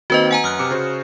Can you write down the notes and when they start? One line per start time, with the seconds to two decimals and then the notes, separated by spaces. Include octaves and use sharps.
0.10 D#3 A#3 C4 F#4 B4 D#5
0.31 F#5 G#5 A#5
0.44 F#2 D#6 F6 F#6
0.59 C3 D6 C#7
0.71 C#3 F#4 C5